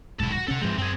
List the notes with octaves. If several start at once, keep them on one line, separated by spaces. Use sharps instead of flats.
D#1 B1 G#2 E4 A4
F#4
C3 C#4 A4 F#5
G#2 E3 F3 G#3 C4
F#2 C4 G#4